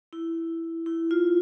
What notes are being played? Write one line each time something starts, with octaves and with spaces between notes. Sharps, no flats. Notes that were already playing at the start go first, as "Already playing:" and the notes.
E4
E4
F4